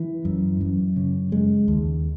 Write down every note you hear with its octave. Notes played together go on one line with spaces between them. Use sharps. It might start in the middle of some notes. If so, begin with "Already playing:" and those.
Already playing: E3
F#2
F#2
C#3
G#3
D#2